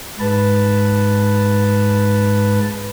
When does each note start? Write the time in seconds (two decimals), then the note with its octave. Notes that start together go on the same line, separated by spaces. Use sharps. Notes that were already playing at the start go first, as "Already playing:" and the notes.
0.20 G#2 B4 A5